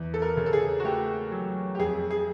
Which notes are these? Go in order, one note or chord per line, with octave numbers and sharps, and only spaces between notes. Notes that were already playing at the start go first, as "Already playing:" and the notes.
Already playing: E2
A4
A#4
C#3
A4
G#4
F#4
A3 G4
F#3
G4
F2 G#4
G#4